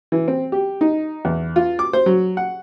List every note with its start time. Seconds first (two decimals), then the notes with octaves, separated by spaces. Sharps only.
0.12 E3
0.28 C4
0.52 G4
0.81 D#4
1.25 E2
1.56 F4
1.79 D6
1.93 C5
2.06 F#3
2.37 F#5